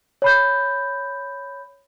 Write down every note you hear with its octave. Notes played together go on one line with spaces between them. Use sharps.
C#5 B5 G6